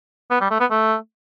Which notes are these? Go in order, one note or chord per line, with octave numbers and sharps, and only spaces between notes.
B3
G3
A3
B3
A3